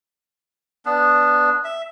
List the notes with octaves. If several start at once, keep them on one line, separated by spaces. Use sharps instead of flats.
B3 D4
E5